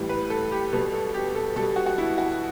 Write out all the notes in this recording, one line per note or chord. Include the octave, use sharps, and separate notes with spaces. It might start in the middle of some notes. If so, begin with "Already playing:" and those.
Already playing: A2 E3 G3
B4
A4
G4
B2 G3 A4
A4
G4
A4
B2 G3 A4
F#4
F#4
E4
F#4